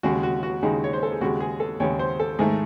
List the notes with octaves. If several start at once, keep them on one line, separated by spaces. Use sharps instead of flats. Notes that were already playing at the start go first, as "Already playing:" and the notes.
D#2 C#3 G#3 F#4
F#4
F#4
D#2 C#3 G#3 D#4
C#5
C5
A4
G#4
D#2 C#3 G#3 F#4
G#4
A4
D#2 C#3 G#3 C#5
C5
A4
G#2 D#3 A3 G#4